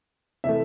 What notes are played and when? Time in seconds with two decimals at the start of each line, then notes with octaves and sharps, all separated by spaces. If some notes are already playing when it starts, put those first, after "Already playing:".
0.44 C3 E3 A3 E5